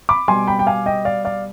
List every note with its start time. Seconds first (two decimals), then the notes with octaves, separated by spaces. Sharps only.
0.09 B5 D6
0.28 B2 G3 G#5 C6
0.47 G5 B5
0.59 G5
0.67 F5 G#5
0.86 D#5 G5
1.05 D5 F5
1.25 D5 F5